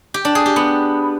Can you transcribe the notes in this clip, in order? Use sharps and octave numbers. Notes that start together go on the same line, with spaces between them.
G4
D4
G#4
G4
B3